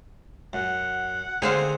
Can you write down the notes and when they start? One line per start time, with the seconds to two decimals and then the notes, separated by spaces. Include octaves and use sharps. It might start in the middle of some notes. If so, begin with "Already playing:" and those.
0.53 F#2 F#5
1.42 D3 D#3 C4 G#4 C5 F5